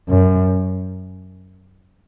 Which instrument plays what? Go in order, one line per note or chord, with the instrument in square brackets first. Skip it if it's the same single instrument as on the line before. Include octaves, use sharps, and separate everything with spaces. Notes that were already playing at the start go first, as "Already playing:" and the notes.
[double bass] F#2